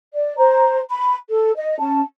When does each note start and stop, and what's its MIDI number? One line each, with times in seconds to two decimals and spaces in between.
0.14 0.36 74
0.38 0.80 72
0.38 0.80 82
0.90 1.15 83
1.29 1.52 69
1.56 1.77 75
1.79 2.02 61
1.79 2.02 81